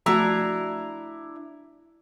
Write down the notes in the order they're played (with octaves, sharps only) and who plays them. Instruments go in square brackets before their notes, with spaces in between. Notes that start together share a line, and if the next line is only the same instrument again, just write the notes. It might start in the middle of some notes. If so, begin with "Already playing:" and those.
[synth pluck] F3 A3 F#4 [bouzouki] D4 E4 A#5